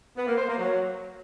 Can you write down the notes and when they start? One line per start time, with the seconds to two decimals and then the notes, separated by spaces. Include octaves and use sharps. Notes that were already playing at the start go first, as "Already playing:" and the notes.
0.16 B3
0.27 A#3
0.37 C5
0.48 A#3
0.58 F#3